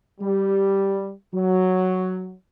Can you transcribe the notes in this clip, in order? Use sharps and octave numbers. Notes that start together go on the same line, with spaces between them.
G3
F#3